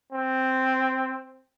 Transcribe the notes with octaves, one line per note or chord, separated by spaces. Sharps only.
C4